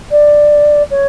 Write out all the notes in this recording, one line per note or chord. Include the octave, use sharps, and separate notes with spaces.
D5
C#5